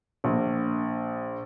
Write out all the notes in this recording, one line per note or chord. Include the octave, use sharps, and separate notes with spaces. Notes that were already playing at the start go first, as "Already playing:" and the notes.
A#1